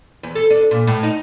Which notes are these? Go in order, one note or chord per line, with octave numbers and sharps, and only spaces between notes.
E2
A4
D4
A#2
A2
D#4